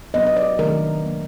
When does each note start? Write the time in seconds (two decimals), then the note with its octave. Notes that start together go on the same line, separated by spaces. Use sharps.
0.14 B2 F#3 B3 D4 D#5
0.27 D#5
0.37 D5
0.58 C3 D#3 F#3 A3 D4 A#4
1.03 D#3 F#3 A#3